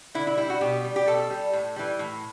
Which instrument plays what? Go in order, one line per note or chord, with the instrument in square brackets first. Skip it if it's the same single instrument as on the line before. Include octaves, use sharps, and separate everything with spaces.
[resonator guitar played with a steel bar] D3 E4
E4
G3 E4
F#4
B2 G4
G3
G4
B2 A4
G3
A2
E3 G3
A2